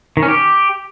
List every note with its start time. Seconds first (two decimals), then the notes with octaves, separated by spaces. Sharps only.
0.17 D#3
0.23 C#4
0.28 G4